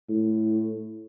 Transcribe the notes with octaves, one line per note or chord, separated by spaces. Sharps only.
A2